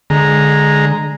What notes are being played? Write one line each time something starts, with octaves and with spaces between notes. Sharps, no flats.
D3 G#3 A#5